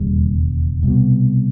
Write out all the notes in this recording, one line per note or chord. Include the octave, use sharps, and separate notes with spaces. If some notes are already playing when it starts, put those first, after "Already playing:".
Already playing: E1 D#2 C#3 G3
C2 B2